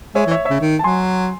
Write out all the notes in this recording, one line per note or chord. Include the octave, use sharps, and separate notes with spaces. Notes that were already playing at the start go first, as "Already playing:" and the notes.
G#3 C#5 E5
E3
C#5 E5
C#3 C#5 E5
D#3
A5
F#3 G#5 C6